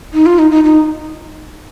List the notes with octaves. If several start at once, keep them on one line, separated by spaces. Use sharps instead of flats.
D#4
F4
D#4
D#4
D#4